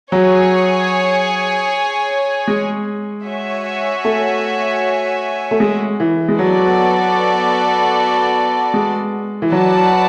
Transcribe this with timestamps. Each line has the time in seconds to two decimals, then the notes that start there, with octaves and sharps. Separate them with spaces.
0.12 F#3 G#4 C#5 G#5
2.48 G#3
3.26 F#4 C#5 E5 G#5
4.05 A3
5.51 A3
5.60 G#3
6.00 E3
6.29 G#3
6.39 F#3 B3 F#4 A4 D5
8.74 G#3
9.42 E3
9.52 F#3 F#4 B4 D5 F#5 A5